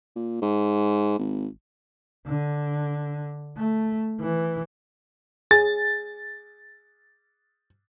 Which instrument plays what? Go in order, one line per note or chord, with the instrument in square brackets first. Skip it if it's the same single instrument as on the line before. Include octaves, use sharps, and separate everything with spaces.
[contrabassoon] A#2
G#2
G#1
[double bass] D3
A3
E3
[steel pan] G#4 [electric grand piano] A6